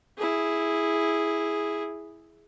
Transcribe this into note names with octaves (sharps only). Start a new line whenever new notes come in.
E4 G#4